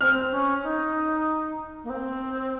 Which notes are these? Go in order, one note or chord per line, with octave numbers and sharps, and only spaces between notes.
C4 F6
C#4
D#4
A#3
C4